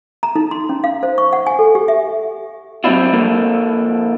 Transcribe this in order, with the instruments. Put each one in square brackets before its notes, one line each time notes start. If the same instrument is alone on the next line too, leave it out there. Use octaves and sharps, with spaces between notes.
[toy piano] A#5
D#4
C6
C#4
F5
C5
C#6
F#5
G#5
A4
G4
E5
[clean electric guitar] F#3 G3 C4 D4 E4 F4
D3 F3 A#3